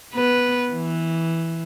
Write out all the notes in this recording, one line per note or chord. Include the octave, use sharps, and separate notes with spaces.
B3 B4
E3